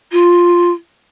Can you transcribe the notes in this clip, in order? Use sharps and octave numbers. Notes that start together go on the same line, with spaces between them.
F4